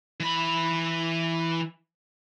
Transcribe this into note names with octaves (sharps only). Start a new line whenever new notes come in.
E3 B5